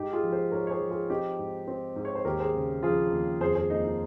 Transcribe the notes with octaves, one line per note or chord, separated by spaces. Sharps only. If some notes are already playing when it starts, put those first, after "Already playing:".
Already playing: G#2 D#4 G4
F4 G#4
F3
G#4 C5
G#2 A#4 C#5
C#5
G#4 C5
F3
F4 G#4
C4 D#4 G4
G#2
C4
G#2
C#5
C5
D#2 G4 A#4
G#4 C5
C#3
F3 F4 G#4
D#2
F2 G#4 C5
G#4 C5
A#3 D#4
D#4